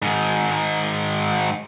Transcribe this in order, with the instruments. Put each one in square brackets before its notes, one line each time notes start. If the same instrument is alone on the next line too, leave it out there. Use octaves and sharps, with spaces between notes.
[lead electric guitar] G#2 D#3